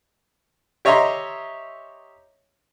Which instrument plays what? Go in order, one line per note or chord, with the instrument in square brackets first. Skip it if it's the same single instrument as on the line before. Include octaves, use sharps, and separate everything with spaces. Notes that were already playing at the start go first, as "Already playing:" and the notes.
[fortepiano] G4 C#5 D#5 E5 A#5 C6